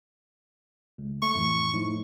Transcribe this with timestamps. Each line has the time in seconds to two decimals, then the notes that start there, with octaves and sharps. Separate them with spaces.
0.98 C#2
1.22 A3 C#6
1.35 F2 A2 E3
1.74 A2 F3 D#4